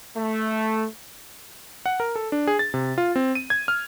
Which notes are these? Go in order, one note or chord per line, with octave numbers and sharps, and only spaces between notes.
A3
F#5
A#4
A4
D4
G#4
A6
C3
F4
C4
D#7
G#6
F6